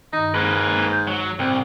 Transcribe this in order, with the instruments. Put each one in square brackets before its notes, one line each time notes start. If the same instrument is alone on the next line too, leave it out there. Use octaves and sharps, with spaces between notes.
[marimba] G2 D#3 [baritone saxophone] D#4
[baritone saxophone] G#2 [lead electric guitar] A#3 B4
[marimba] G6
[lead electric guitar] F#3
[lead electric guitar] C2 [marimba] A2 [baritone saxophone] C4